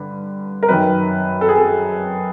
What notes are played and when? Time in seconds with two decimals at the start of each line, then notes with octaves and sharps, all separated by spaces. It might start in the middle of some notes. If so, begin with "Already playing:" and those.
Already playing: G2 D3 B4
0.63 A#4
0.68 F#2 D#3 B4
1.41 A4
1.49 G#4
1.56 A4